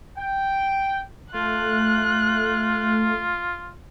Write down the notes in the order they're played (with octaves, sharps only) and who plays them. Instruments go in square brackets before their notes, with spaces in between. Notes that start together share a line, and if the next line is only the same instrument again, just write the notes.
[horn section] G5
[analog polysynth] A3 [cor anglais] F4 [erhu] F#6